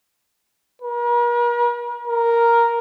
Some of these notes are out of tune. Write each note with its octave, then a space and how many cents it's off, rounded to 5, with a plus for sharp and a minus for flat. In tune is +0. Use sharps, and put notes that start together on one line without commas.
A#4 +45
A#4 +0